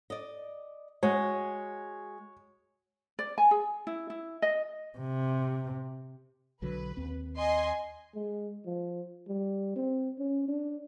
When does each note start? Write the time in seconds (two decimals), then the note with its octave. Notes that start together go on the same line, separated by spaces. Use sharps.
0.10 D5 D#5
1.03 G#3 F#4 C#5
3.19 D5
3.38 G#5
3.51 G#4
3.87 E4
4.10 E4
4.42 D#5
4.98 C3
6.62 B1 D3 F#3 B4
6.97 D#2 C4
7.35 D#5 G#5 C6
8.15 G#3
8.66 F3
9.28 G3
9.76 C4
10.19 C#4
10.48 D4